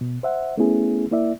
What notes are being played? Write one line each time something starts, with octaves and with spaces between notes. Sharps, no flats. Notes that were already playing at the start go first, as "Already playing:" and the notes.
B2
C5 E5 F#5
A3 B3 C#4 E4 G#4
A#3 E4 D5 E5